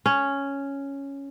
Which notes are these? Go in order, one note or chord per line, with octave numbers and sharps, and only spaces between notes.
C#4